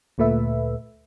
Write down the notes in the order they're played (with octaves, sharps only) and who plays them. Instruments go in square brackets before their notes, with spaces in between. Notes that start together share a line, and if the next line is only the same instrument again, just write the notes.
[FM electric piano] D2 A#2 A3 B4 E5